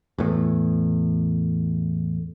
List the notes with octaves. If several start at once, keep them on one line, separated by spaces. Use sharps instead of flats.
E2 A2